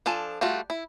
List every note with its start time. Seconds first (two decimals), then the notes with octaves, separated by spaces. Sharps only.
0.06 F3 D4 A4 G#5
0.41 G3 A3 F4 F#4
0.70 E4